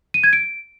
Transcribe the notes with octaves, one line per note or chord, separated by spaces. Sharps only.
D#7
G#6
D7